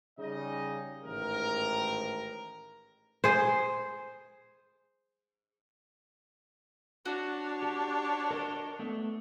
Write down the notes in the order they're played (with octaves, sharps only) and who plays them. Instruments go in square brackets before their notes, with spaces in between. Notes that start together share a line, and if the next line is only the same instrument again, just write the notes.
[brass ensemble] C#3 G3 D#4 G#4 D#5
A1 G#2 D#3 A#4
[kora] G#4 C5
[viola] D4 C#5 [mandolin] F#4
[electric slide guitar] G4
A#4 D#5 A5
A3 B3